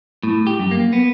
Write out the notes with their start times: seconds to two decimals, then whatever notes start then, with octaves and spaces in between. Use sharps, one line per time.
0.23 A2
0.47 G4
0.59 F#2
0.71 A#3
0.93 B3